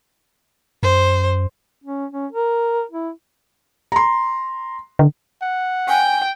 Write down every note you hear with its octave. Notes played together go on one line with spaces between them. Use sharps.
F#2 C5
C#4
C#4
A#4
E4
A#5 C6
D3
F#5
G5 G#5